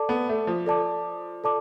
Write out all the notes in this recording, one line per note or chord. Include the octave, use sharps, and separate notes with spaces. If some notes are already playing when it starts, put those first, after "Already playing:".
Already playing: A4 D5 A5 D6
B3
A3
F3
A4 D5 A5 D6
A4 D5 A5 D6